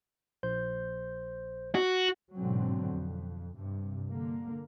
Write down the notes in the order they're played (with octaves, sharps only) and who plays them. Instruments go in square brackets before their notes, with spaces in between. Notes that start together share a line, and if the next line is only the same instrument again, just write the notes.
[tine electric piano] A#1 C5 G6
[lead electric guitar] F#4
[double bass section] A1 G#2 B2 D3 F#3 C4
F2
G2 C3
D3 A#3